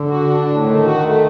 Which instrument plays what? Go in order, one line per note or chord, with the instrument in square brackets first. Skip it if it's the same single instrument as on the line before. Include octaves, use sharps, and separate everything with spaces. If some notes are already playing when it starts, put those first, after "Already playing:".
Already playing: [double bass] D3
[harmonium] F#4
D4
A2
[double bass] D#3 [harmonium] A3
[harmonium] F#4
A3